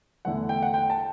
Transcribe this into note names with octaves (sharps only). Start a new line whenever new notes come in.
E2 D3 A3 E4 F#5
G5
F#5
G5
A5